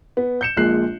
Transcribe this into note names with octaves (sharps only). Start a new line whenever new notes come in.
B3
G6 C#7 E7
A#1 A#2 G#3 F#6 C7